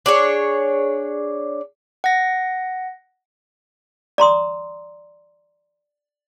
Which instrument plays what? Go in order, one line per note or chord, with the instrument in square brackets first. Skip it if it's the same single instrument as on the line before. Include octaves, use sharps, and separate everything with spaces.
[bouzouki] D4 G#4 C#5
[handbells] F#5 A#6
[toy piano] D5 A#5 C6 D#6